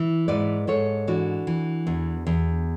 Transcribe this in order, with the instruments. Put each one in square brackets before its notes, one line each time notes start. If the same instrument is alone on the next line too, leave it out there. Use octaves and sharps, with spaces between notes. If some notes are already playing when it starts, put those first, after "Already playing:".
Already playing: [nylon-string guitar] E3
G#2 B4 D5
G#2 A4 C#5
E3 D4 F#4
E3
E2
E2